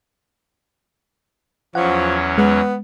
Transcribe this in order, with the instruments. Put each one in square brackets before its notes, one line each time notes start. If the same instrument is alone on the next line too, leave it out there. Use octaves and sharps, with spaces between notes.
[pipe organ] E2 F#3 C#4 [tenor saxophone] F3 [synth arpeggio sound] F#5
[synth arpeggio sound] G#3 [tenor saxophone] B3